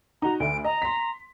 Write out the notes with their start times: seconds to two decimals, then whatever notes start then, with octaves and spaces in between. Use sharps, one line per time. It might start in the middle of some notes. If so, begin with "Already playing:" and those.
0.22 D#4 F#4 A#5
0.40 D2 A3 D7
0.64 D#5 A#5
0.82 C6 B6